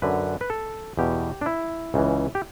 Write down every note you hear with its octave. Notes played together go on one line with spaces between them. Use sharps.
F#2 D3 B4
B4
A4
E2 B2 G4
D4
E4
C#2 C#3 E3
G4